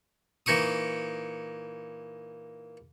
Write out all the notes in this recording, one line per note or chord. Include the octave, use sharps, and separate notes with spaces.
A#2 E3 D#4 C#6 D#6